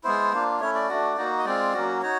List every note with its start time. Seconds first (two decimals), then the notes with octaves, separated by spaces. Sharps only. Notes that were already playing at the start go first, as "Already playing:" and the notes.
0.04 G#3 B3 E4 C5
0.32 A#3 D4 F4
0.61 A3 C#4 E4 C#5
0.75 D5
0.89 A3 D4 F#4
1.17 A#3 D#4 F#4
1.39 D#5
1.45 G#3 C4 F4 D5
1.73 F#3 A#3 C#4 F#4
2.02 D#4 F#4 C#5